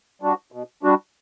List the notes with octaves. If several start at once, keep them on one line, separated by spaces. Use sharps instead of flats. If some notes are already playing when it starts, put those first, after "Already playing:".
G3 D4 F#4
B2
G3 D4 F#4